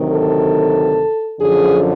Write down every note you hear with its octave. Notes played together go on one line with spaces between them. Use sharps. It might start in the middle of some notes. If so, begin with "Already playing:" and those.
Already playing: D2 C3 D#3 F#3
A4
F#2 D3 F3 G#4